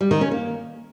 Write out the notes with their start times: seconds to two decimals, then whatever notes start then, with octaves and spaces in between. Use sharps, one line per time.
0.01 G3
0.11 D#3
0.21 C#4
0.31 A#3